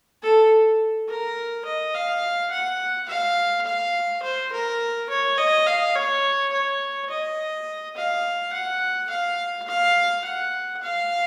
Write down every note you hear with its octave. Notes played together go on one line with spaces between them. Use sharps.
A4
A#4
D#5
F5
F#5
F5
F5
C5
A#4
C#5
D#5
F5
C#5
C#5
D#5
F5
F#5
F5
F5
F#5
F5